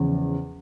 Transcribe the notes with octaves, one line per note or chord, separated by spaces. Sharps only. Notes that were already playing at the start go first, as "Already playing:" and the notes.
Already playing: E2 C#3 F3